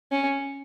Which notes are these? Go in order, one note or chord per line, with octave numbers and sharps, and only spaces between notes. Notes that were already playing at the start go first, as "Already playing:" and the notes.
C#4